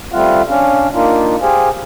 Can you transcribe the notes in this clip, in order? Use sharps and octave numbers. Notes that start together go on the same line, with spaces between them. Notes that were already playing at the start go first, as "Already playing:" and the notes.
G3 A3 C4 F4 F5 F#5
C#4 D4 F5
A#3 D4 D#4 F4
G4 G#4 C5 F5 G#5